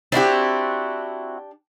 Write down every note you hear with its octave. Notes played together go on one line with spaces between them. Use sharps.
C4 D4 E4 F#4 G4